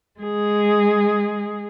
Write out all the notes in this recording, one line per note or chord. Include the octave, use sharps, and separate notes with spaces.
G#3 G#4